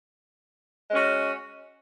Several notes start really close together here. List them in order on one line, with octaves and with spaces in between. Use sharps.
G#3 C#4 F#4